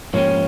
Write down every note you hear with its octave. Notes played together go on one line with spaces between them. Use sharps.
G#2 F3 A#3 C#4 G4 C#5